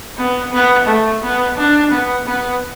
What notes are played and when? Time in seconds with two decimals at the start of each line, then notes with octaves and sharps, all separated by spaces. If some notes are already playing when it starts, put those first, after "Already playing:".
0.17 B3
0.52 B3
0.87 A3
1.22 B3
1.57 D4
1.91 B3
2.26 B3